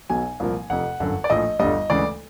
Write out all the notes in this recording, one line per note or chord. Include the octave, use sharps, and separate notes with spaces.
B1 B2 F#3 G#5
C2 A#2 F3 A#3
F1 F2 C3 F#5
G1 F#2 D3
D5
A#1 A2 F3 D#5
G1 G2 D3 G3 D#5
D2 C#3 E3 G#3 D5